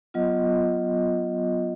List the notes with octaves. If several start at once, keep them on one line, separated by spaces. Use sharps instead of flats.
F#3 B3 F4 D#5